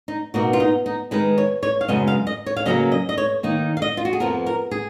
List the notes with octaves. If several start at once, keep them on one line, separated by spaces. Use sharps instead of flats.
D#4
B2 A#3 D#4 F#4
F4
D#4
D#4
D#3 G#3 D#4 B4
C#5
C#5
F5
F#2 C#3 G#3 B3 D#5
F5
D#5
C#5
F5
C#3 F#3 A#3 C#4 D#5
D#5
D#5
C#5
D#3 A#3 D#4
F5
D#5
F4
F#4
G#4
F2 F3 B3 A#4
A#4
G#4